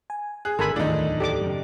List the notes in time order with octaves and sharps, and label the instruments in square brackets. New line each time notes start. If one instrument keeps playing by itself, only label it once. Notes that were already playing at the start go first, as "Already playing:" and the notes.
[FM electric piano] G#5
[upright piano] G#4 [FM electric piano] F#6
[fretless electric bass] G#1 D3 [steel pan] A4 G#5 B5 [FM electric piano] A#4 C6
[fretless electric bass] D1 E2 [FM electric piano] D#3 A3 F4 [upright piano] D4 D#4
[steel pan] G4 D5 D6 [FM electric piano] A4
[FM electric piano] F#2 C#3